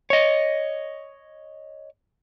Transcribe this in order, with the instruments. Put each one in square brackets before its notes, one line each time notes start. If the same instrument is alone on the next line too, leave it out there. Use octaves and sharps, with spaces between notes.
[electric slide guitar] C#5 D#5